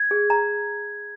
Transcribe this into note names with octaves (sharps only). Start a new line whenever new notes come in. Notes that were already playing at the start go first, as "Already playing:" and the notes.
Already playing: G#6
G#4
A#5